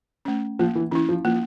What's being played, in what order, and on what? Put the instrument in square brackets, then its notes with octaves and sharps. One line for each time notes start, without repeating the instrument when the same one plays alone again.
[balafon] A3 C#4
[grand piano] F3 [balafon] A#3
[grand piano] E3
[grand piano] E3 [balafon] C#4
[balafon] E4
[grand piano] F3
[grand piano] F3 [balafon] A#3